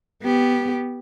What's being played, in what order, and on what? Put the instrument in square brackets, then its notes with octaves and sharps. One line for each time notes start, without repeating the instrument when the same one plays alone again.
[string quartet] B3 G4